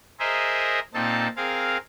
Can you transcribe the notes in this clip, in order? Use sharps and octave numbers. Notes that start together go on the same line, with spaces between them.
G#4 A#4 C5 D#5 E5
A#2 C4 D#4 A4 A5
C4 G#4 A#4 F5